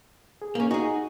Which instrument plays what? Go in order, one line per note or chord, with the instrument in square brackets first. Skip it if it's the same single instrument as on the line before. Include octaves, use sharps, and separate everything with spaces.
[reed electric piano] G#4
[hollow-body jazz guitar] A#3 C#4
[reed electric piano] D#4 [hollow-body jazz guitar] F#4 G#4